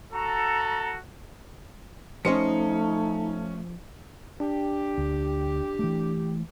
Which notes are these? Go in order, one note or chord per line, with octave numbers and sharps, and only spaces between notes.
F#4 A4 A#5
F3 A3 C#4 D#4 C5 D#5 C#7
D4 G4
D2
E3 A3